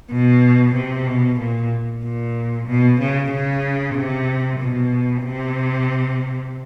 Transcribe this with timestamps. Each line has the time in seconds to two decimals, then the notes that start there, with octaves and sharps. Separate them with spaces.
0.11 B2
0.75 C3
1.07 B2
1.40 A#2
2.04 A#2
2.67 B2
3.00 C#3
3.32 C#3
3.95 C3
4.60 B2
5.23 C3